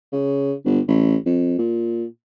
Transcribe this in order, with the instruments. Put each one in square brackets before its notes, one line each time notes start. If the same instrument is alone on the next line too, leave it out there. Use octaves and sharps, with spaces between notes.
[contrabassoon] C#3
G1
A1
F2
A#2